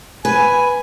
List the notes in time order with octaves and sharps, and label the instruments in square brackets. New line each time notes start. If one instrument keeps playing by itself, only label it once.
[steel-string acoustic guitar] B4 [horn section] G#5